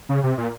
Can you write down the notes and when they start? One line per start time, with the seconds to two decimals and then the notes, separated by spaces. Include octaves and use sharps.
0.09 C#3
0.23 C3
0.38 A#2